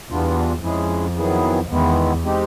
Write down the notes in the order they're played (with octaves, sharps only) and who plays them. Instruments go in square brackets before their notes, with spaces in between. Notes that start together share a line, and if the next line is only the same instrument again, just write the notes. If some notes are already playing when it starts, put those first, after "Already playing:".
[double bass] E2 [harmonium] E3 G3 B3 D4 F4
[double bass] F2 [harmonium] G#3 C#4 E4 G#4
[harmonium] D#3 F#3 B3 E4 G#4
[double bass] E2 [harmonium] D#3 G#3 B3 E4
[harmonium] G#3 C4 D#4 G4